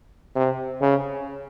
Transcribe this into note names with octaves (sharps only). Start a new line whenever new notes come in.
C3
C#3